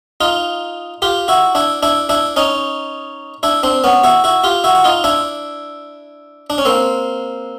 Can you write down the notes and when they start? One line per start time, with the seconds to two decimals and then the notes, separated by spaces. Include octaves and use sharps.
0.21 D#4 F4
1.02 F4 G4
1.28 E4 F#4
1.55 D4 E4
1.83 D4 E4
2.09 D4 E4
2.36 C#4 D#4
3.43 D4 E4
3.63 C4 D4
3.84 B3 C#4
4.04 E4 F#4
4.24 E4 F#4
4.44 F4 G4
4.64 E4 F#4
4.75 F#4
4.84 D#4 F4
5.04 D4 E4
6.50 D4
6.58 C#4
6.65 A#3 C4